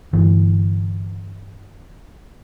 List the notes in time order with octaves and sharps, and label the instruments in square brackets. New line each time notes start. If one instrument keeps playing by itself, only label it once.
[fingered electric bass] G1 E3